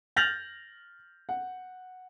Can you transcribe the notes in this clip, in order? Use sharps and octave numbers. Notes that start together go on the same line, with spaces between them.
F6 G6 A6 A#6 F7 F#7
F#5